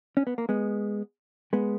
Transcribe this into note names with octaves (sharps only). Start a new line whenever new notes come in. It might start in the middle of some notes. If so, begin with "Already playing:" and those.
C#4
B3
A#3
G#3 B3
G#3 B3